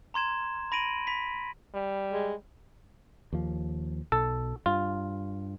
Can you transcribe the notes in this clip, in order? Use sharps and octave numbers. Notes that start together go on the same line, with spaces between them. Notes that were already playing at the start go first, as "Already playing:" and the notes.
A#5 C6 G#6 E7
B5 A#6 D7 D#7 F#7
B5 B6
G3
G#3
D#2 F3
B1 B2 A4
G2 F4